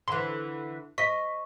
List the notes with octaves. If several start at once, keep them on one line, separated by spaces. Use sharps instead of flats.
D3 E3 C6
D#5 C#6 B6